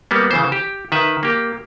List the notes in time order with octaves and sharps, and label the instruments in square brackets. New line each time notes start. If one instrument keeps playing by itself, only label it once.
[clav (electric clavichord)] G3 A#3 B3
C#3 E3 C5
G4
D#3 B4 E5
A#3 G4